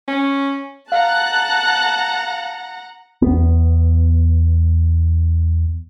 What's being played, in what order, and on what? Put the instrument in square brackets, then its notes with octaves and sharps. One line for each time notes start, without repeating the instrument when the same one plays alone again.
[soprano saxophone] C#4
[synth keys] F5 [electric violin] F#5 A#5 [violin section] A5 F#6
[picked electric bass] E2 B3